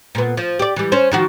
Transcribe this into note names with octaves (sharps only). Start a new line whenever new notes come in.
A#2 B3
F3
G4 D5
E3 G3
C#4 C5
D#3 F3 F#4